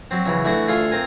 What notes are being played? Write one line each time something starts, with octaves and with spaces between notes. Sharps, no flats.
F#3 C4
C#3 E3 F#3
E3 A3 D4 F#4
D2 F4 G#4 A4 E5 F5
C4 A#4 G#5